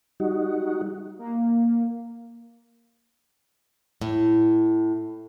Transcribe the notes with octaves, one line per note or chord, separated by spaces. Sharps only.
G3 D#4 F#4
A#3
A2